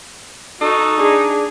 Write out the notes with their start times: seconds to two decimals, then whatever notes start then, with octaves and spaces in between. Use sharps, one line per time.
0.61 D#4 F#4 A4
0.98 D4 G#4